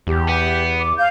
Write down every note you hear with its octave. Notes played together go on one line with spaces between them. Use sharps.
E2 G4
B3
D6
F5 G6